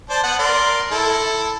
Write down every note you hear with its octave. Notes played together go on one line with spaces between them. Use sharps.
C5 D5 A5
B3 B4 F#5
A#4 D5 C6
E4 A4